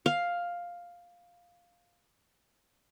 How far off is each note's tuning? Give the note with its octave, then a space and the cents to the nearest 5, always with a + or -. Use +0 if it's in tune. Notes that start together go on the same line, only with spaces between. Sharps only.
F5 +5